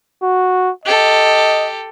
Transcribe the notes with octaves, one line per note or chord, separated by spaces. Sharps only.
F#4
G4 A4 D#5